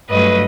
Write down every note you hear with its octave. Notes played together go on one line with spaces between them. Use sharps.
G2 F#3 A3 B4 D#5